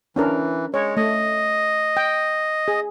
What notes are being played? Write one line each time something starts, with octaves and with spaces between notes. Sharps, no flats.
E3 C#4 D4 A#4
G#3 C#5
A3 D#5
G5
G#4